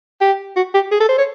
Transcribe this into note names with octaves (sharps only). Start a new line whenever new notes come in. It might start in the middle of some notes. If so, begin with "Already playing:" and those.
G4
F#4
G4
G#4
A4
C5
C#5